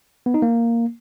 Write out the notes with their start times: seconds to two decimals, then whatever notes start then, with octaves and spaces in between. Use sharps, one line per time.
0.26 B3
0.34 D#4
0.42 A#3